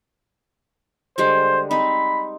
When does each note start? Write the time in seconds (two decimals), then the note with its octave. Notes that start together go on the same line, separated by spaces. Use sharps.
1.18 D3 G3 G#3 C5
1.71 C4 D#4 B5